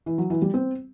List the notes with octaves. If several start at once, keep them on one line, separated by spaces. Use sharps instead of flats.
E3
F#3
E3
G3
C4